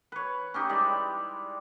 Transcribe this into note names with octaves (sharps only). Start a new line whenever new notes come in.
B4 C#5
C#4 D#4 G4
G3 G#3 E4 D5